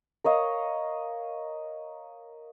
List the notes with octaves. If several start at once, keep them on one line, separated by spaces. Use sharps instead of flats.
A#4 C#5 D#5 F5